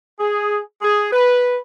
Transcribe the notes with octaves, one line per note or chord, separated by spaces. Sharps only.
G#4
G#4
B4